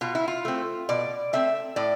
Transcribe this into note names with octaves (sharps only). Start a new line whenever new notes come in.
B2 F4
E4
F4
A3 C4
B2 D5
A3 C4 E5
A2 D5